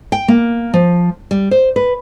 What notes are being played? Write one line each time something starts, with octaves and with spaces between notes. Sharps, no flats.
G5
A#3
F3
G3
C5
B4